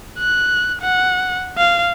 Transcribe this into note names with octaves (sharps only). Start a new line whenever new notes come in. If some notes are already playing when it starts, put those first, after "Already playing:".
F#6
F#5
F5